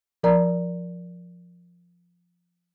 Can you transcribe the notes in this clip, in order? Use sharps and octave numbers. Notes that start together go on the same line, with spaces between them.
F3 A#4 D5 A#5